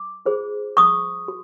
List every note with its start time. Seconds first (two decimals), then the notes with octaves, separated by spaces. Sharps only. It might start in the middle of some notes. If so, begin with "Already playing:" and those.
Already playing: D6
0.26 F4 G#4 C5
0.77 C#6 D#6
1.28 F#4